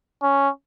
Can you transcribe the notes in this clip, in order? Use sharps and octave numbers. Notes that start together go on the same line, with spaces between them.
C#4